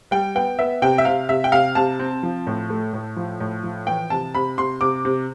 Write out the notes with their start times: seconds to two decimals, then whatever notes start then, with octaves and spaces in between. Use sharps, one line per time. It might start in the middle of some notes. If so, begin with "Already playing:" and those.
0.11 G3 G5
0.35 B3 G5
0.59 B3 E5
0.82 C3 G5
0.98 E5
1.05 C3 F5
1.29 C3 E5
1.44 G5
1.52 C3 F5
1.75 C3 A5
1.99 C4
2.23 F3
2.47 A2
2.69 A3
2.93 A2
3.16 F3
3.40 A2
3.63 F3
3.87 E3 G5
4.10 C3 A5
4.34 C3 B5
4.58 C3 C6
4.81 C3 D6
5.05 C3